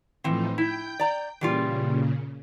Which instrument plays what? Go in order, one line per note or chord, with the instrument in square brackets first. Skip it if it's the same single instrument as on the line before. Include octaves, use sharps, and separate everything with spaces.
[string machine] A2 F3 D#4 [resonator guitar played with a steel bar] E3 C4
[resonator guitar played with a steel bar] E4 [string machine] G5 G6
[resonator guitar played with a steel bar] D5 A#5
[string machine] A#2 C#3 [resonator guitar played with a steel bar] E3 G3 F4